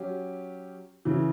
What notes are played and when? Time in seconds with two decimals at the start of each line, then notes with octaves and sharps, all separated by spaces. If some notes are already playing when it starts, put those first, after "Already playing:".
Already playing: F#3 C#4 G4
1.05 C#3 E3